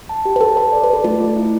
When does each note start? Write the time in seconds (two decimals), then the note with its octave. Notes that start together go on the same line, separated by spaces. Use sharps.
0.09 A5
0.25 G4
0.36 B4
0.41 A4 A5
0.57 B4 A5
0.72 D5
0.83 B4
0.88 A4 D5
1.04 A3 F4
1.20 A3
1.36 E4